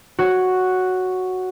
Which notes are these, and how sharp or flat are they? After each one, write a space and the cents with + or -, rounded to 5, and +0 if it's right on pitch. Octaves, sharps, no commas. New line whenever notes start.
F#4 +0 C#5 +0